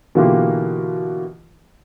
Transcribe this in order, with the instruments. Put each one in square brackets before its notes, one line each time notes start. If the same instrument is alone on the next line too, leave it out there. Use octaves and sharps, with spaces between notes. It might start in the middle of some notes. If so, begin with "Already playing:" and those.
[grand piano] B2 D3 E3 A#3 F4 G4